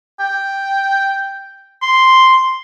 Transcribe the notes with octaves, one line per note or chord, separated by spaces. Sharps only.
G5
C6